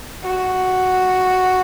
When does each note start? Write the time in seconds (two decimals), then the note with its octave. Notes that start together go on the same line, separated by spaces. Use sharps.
0.23 F#4